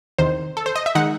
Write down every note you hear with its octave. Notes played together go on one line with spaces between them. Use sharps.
E2 C3 D#3 C5
A4
C5
D#5
E5
D#3 G#3 D#4 F#5